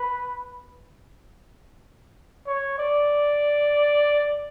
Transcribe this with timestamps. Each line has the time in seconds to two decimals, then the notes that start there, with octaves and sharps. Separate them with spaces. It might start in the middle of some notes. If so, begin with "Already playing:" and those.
Already playing: B4
2.47 C#5
2.78 D5